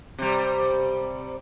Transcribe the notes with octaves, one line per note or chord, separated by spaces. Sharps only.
C3 G3